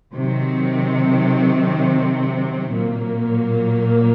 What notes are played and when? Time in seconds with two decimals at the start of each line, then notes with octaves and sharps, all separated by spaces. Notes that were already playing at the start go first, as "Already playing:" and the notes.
0.14 C3 D#3 F#3 C4
2.72 A#2 F#3 A#3